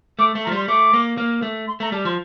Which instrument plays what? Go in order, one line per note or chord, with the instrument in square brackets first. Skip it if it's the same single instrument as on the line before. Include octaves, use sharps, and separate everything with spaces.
[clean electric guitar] A3 [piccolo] D6
[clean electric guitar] A3
[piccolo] A#5
[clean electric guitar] F3
[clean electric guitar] G3 [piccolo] C6
[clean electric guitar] A3 [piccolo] D6
[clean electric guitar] A#3
A#3
A3
[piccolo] C6
[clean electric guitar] A3 [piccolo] A#5
[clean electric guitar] G3 [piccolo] A5
[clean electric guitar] F3 [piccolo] C6